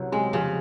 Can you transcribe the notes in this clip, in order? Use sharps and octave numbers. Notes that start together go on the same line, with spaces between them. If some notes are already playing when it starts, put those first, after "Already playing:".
Already playing: C2 C3 F#3
C3 G#3
F2 C#3